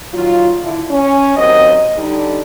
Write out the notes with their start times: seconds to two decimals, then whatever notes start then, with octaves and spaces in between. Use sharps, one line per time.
0.13 A#2 D#3 F#3 F4
0.62 D3 E4
0.91 C#4
1.36 D#2 F#3 C4 D#5
1.96 D3 G3 D4 D#4